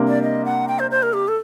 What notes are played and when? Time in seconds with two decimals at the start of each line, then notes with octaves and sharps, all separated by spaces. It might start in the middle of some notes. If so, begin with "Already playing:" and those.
Already playing: C3 G3 A#3 D4
0.08 D5
0.23 D#5
0.45 F#5
0.68 G5
0.79 C5
0.91 C5
1.03 A#4
1.13 G4
1.28 A4